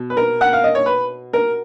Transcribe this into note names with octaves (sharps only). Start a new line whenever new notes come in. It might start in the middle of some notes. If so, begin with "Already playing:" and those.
Already playing: B2
B4
A#4
F#5
F5
D#5
C#5
B4
A#4